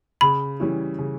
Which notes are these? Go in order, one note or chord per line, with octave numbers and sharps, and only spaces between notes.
C#3 B5
E3 G3 C#4 E4
C#3